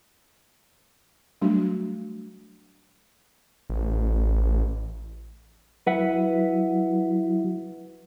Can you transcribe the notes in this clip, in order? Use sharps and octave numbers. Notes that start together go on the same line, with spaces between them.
F#3 G3 A3 D4 F#4
A1
F#3 E4 B4 E5 F#5